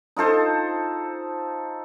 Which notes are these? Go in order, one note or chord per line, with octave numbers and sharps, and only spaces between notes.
D#4 F4 A4 C5